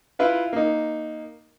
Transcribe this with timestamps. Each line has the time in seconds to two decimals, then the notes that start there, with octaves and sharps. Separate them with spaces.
0.19 E4 F4 B4 F5
0.53 A#3 D#4